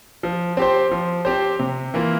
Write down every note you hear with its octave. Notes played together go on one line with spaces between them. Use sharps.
F3
C4 G4 C5
F3
C4 G4 C5
C3
E3 A#3 F4